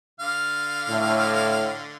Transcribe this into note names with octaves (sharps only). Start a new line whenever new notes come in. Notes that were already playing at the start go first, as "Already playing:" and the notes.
D3 F5
A2